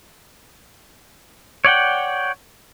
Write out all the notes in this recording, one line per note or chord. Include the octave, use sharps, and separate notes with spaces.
C#5 D5 F#5 G5